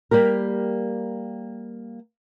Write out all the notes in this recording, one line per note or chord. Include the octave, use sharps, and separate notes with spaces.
G3 A#3 G4 A#4